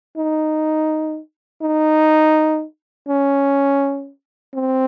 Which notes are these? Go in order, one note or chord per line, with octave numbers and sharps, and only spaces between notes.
D#4
D#4
C#4
C4